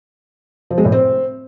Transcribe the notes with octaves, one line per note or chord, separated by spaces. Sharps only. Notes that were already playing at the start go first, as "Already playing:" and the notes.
F3
G#3
A2
C4